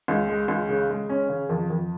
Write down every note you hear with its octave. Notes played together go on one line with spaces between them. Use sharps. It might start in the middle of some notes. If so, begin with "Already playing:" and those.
C#2
G#3
C#2
C#3
G#3
C#4
C#3
F2
F2